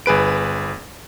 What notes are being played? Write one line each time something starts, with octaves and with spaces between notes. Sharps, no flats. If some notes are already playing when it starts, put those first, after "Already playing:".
G1 G#4 B4 D7